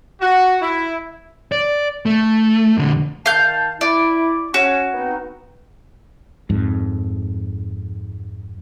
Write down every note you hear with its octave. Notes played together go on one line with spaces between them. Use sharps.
F#4
E4
D5
A3
F2 D3
D#3 F5 A5 G6
E4 D5
C#4 F#4
B3 C4 D#4
F2 G#2